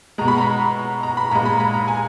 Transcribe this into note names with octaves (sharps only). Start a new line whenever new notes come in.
B2 G#3 A#5
B5
A#5
A#5
B5
A#2 G#3 A#5
B5
A#5
A#5
G#5